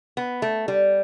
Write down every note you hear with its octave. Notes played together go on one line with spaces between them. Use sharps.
B3
A3
G3